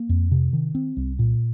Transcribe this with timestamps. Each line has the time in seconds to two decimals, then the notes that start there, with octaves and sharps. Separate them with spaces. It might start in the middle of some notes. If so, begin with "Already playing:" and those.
Already playing: A#3
0.09 F2
0.31 C3
0.53 D#3
0.75 C4
0.97 C2
1.19 A#2